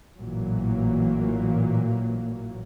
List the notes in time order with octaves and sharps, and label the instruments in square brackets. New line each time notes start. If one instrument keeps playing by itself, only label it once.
[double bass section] A1 A#2 E3 F#3 A#3